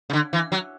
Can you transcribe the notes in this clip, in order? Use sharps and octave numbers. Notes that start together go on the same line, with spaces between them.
C#3
D3
E3
F#3